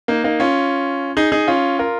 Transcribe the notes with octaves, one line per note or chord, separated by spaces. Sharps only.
A#3 D#4
A#3 D#4
C#4 F4
D#4 G#4
D#4 G#4
C#4 F4
F4 A#4